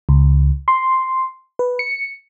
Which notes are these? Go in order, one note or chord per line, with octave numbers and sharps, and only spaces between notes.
C#2
C6
B4
C#7